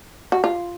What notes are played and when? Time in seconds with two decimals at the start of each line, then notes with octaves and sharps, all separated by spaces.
0.32 F#4
0.44 F4